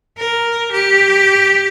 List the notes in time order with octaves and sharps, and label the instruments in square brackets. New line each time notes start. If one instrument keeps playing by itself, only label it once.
[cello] A#4
G4